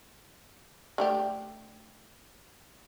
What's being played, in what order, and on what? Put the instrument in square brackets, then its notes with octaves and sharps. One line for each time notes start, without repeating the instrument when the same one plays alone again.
[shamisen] D3 A3 G4